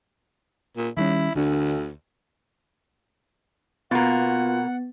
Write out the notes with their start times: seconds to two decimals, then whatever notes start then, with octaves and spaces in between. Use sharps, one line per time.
0.77 A#2
0.97 D#3 G3 C#4 E4
1.35 D2 D3 D4
3.91 B2 A#3 B3 F4 F#5 A6